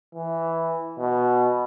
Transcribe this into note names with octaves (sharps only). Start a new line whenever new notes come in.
E3
B2